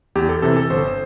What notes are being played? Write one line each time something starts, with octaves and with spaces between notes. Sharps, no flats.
E2 G4
A4
C3 E3 A4
A4
G1 C5